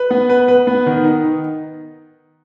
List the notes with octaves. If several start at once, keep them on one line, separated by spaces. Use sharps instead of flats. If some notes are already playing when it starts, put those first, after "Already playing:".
Already playing: B4
B3
B4
B4
B3
D#3
D#4